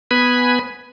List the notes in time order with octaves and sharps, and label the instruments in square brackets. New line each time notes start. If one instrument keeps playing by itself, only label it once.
[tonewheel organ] B3 B4 G#5 B5